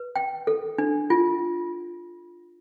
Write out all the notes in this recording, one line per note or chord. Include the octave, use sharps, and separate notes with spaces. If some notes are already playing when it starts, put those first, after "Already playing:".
Already playing: B4
G5
A4
D4
F4